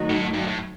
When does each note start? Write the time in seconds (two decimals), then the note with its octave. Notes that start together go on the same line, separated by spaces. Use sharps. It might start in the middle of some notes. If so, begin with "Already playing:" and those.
Already playing: D#3 F#3 A3 D#4 F#4
0.10 A2
0.34 G2
0.47 A2